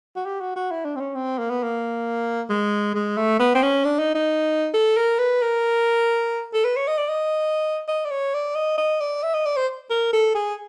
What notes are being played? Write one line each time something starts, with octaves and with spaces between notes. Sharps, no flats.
F#4
G4
F#4
F#4
E4
D4
C4
C#4
C4
A#3
B3
A#3
G#3
G#3
A3
B3
C4
C#4
D4
D#4
D#4
A4
A#4
B4
A#4
A4
B4
C#5
D#5
D5
D#5
D#5
D5
C#5
D5
D#5
D#5
D5
E5
D#5
D5
C5
A#4
A4
G#4